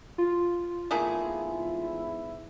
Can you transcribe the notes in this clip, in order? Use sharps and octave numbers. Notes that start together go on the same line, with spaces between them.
F4
E2 G#2 A3 A#3 E4 G#4